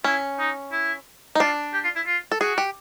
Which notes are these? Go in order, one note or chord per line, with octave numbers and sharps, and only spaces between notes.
C#4 E4
D#4
E4
D#4
D4 F4
G4
F4
E4
F4
A4
F#4 G#4
G4